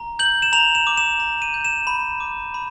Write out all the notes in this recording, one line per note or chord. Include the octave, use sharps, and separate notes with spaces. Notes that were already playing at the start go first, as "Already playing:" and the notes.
Already playing: A#5
G6 F#7
E7
A#5 F7
E7
D6
E7
A#5
D#7
G6
E7
B5
D6
B5